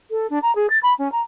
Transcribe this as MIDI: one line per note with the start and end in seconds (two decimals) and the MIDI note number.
0.11 0.27 69
0.30 0.39 62
0.42 0.54 82
0.55 0.69 68
0.70 0.78 93
0.83 0.93 83
0.98 1.11 61
1.12 1.21 82